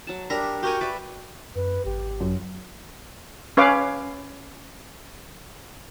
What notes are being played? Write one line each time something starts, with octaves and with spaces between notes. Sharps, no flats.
F#3 A5
G3 D4 A#4 E5 A#5
F#4 G4 A#4 G5 G#5 C#6
B4 D5 E5
F#2 B4
G#1 G4
F#2
C#4 B4 C#5 F5 D6